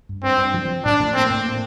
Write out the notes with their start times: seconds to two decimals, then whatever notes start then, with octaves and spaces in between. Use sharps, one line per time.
0.09 G2
0.23 G2 C4
0.38 G2
0.54 F3
0.69 F3
0.85 A2 D4
1.00 A2
1.14 A#3 C4
1.30 A2
1.45 A#3